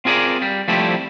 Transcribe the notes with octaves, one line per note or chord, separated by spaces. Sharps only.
C4 F4 G#4 A#4 D5
G3
F3 G3 A3 C4 E4 G4